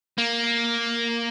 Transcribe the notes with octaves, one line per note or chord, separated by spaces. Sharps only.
A#3